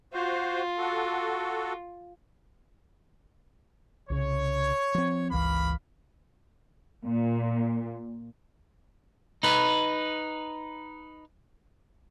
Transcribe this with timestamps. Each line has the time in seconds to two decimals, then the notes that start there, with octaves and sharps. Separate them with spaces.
0.13 F4 F#4 C5
0.78 F#4 A4
4.10 C2 C#3 C#5
4.94 F3 C4
5.31 G1 C#2 E3 A#3 F5 B5
7.07 A#2
9.43 D#4 B4